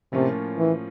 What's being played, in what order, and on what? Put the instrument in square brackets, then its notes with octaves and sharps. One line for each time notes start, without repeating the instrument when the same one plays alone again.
[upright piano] A2 F3 A#3 C#4 F4 [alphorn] C3
[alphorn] E3